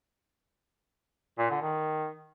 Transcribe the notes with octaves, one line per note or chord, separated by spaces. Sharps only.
A#2
D3
D#3